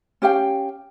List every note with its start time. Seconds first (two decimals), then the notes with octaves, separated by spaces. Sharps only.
0.22 C#4 G4 F5 G5